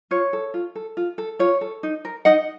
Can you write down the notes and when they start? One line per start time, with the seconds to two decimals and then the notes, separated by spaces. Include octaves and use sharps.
0.11 F4 C#5
0.33 A4
0.54 F4
0.75 A4
0.97 F4
1.18 A4
1.39 F4 C#5
1.61 A4
1.83 D#4
2.05 A#4
2.25 D#4 D#5 F#5